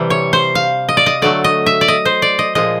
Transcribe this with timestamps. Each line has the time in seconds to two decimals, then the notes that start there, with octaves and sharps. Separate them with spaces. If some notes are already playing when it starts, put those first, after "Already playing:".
Already playing: C3 E3 G3
0.10 C#5
0.33 C5
0.55 F5
0.89 D#5
0.97 D5
1.06 D#5
1.22 D3 F#3 A3 D5
1.44 D#5
1.66 E5
1.81 D5
1.88 D#5
2.05 C5
2.22 D5
2.39 D#5
2.55 A#2 F3 G#3 D#5